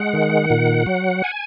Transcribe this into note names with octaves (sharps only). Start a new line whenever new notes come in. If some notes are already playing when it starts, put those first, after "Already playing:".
Already playing: G#3 F#5
D#3
A#2
F#3
G#5